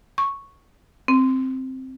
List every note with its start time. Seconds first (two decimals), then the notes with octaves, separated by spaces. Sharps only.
0.18 C#6
1.08 C4